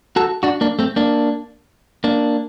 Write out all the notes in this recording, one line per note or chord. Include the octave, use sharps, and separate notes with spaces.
F#4 A4
D4 F#4
A#3 D4
A3 C4
A#3 D4
A#3 D4